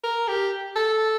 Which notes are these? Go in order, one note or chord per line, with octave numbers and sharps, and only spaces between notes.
A#4
G4
A4